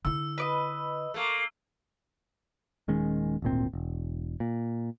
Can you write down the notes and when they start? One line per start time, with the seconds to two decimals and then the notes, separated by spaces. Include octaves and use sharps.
0.05 D3 E4 E6
0.38 B4 D5 D#5
1.14 A3 A#3
2.88 D#1 D#3 G#3 C#4
3.42 D1 G#1 A#2 C4
3.73 E1
4.40 A#2